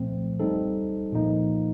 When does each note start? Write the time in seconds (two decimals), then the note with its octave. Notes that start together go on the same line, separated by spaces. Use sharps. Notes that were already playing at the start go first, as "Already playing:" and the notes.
Already playing: A#2 F3 A3 C4
0.40 G3 C4 D#4 A4
1.13 A#2 F3 A#3 D#4